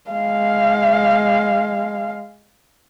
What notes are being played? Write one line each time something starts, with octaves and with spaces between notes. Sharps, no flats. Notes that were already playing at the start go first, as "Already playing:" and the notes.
G#3 F5